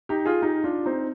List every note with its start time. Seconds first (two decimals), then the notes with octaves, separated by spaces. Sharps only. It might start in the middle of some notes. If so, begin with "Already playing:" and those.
0.09 D#4 G4
0.26 F4 G#4
0.42 D#4 G4
0.64 D4 F4
0.86 C4 D#4